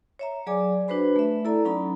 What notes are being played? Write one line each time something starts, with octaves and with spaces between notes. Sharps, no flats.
C#5 E5 A#5
F#3 G#4 D5 G#5 D6
D4 F#4 B4 C5 B5
A3 E5
E4 A4 D5 A#5
F#3 C#4 D#4 A#5 B5